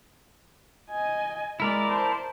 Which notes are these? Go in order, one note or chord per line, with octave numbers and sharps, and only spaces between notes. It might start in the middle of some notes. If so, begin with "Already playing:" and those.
D#5 G#5
G#3 E4 A#4 D5
C5 A5